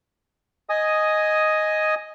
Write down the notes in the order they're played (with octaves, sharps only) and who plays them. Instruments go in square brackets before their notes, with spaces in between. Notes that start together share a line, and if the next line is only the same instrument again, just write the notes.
[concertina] D#5 G#5 D#6